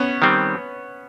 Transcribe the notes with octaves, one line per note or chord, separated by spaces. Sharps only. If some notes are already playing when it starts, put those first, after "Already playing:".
Already playing: B3 C#4
D#3 G3 C4